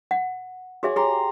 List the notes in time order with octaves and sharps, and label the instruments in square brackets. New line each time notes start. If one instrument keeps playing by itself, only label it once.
[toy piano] F#5
[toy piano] F#4 G#4 E5 [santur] C#5 F#5 G#5
[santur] G4 A#5 C6 [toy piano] G#4